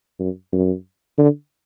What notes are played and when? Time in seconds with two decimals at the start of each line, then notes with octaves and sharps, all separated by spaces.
0.19 F#2
0.53 F#2
1.18 D3